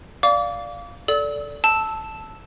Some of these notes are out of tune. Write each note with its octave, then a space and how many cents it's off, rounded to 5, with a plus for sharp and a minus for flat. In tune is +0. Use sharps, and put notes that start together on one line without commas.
D5 +0 F5 +0 D6 -35
A4 +0 D5 -15 E6 -40
A5 +0 E6 -5